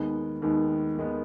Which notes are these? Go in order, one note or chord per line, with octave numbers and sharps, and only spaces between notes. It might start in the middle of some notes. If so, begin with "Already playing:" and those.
Already playing: D#2 D#3 G#3 B3
D#2 D#3 G#3 B3
D#2 D#3 G#3 B3